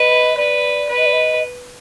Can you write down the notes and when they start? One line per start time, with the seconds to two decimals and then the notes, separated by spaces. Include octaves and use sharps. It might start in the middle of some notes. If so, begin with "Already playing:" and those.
Already playing: B4 D#5
0.37 B4 D5
0.89 B4
0.97 D#5
1.06 D5
1.13 D#5